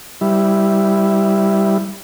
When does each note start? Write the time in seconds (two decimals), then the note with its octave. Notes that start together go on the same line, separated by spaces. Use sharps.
0.21 G3 E4